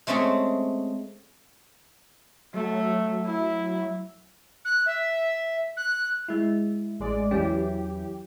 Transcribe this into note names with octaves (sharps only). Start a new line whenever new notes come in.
G#3 A3 C4 C#4 G#4
F#3 A3
E4
F#6
E5
F#6
G#3 E4
A1 G#3 D5
E2 E3 F#3 C#4 G4